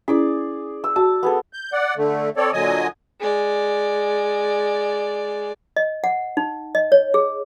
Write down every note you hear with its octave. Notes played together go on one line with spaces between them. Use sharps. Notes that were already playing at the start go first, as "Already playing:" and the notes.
C#4 E4 G#4 D5
E6
F#4 A5
B3 G#4 A4
G6
D5 F#5
D3 A3
C4 A4 C#5 D5
A#2 D3 F#3 D#5 G#5 D#6
G#3 D5
D#5
F#5
D#4
D#5
C#5
G#4